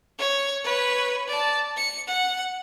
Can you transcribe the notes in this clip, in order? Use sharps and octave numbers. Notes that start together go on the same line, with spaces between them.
C#5
B4 C#5
D5 A5
C#7
F#5